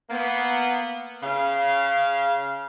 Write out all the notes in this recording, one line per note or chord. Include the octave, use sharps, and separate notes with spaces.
A#3 B3
C#3 F5